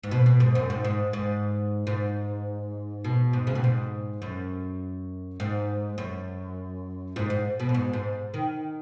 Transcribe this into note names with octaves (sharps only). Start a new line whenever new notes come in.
G#2
B2
B2
G#2
F#2
G#2
G#2
G#2
G#2
B2
G#2
C#3
B2
G#2
F#2
G#2
F#2
G#2
G#2
B2
F#2
G#2
G#2
D#3